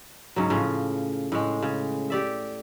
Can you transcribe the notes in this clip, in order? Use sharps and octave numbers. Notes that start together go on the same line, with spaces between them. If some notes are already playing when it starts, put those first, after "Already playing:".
G#2 C#3 F#3
A2 C#3 F3 F4
A2 G#3
C#3
G4 D5 E5